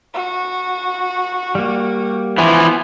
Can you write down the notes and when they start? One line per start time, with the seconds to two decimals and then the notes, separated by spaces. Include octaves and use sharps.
0.14 F#4
1.55 G3 A#3
2.38 E3 F3 B3 E4 G#5 C6